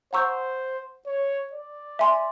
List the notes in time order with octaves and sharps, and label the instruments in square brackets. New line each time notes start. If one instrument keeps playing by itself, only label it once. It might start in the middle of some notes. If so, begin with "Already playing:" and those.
[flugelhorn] C5 [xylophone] F#5 A#5 C#6 E6 G6
[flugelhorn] C#5
D5
[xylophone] E5 G#5 C6